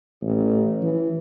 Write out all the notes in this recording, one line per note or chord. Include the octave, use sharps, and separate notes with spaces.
A1
E3